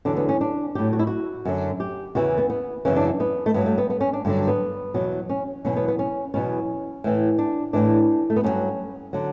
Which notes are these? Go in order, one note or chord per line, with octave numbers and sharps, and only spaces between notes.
E2 D3 F#3 D4
B3
C#4
D4
A2 F#3 G4
F#4
E4
F#4
F#2 D3 F#3
G4
E2 C#3 E3 F#4
B3
B3
F#2 C#3 E3 C#4
D4
B3
A3
G2 F#3 B3
A3
B3
B3
C#4
D4
G2 D3 F#3
B3
E2 B2 F#3
C#4
E2 B2 F#3 C#4
B3
B3
C#4
E2 B2 F#3 C#4
A2 E3
D4
A2 E3 D4
A3
B3
G2 D3 F#3 C#4
D3 F#3